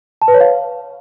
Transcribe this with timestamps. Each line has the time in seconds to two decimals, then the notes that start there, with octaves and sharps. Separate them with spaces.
0.22 A5
0.28 B4
0.34 C#5
0.41 F5